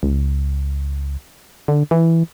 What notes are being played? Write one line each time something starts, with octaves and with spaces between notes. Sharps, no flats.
C#2
D3
E3